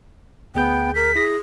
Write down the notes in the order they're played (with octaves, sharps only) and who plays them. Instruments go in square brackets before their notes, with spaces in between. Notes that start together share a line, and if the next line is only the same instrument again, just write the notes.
[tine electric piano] D2 G#4 G6 [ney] B3 [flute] G5
[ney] A#4 [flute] B6
[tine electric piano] E4 A#6 [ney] G#4